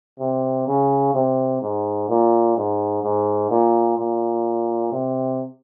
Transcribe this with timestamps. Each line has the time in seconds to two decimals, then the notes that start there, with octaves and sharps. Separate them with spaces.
0.19 C3
0.67 C#3
1.14 C3
1.62 G#2
2.09 A#2
2.56 G#2
3.03 G#2
3.50 A#2
3.98 A#2
4.92 C3